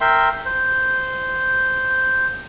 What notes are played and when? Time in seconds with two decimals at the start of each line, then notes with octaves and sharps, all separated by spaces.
0.01 A#4 E5 G5 C6
0.45 C5